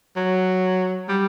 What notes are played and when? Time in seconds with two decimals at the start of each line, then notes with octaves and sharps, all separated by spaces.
0.16 F#3
1.09 G3